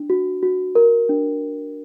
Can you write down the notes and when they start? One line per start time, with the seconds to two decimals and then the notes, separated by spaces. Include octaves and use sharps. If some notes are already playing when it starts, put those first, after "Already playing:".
Already playing: D4
0.10 F#4
0.43 F#4
0.75 A#4
1.09 D4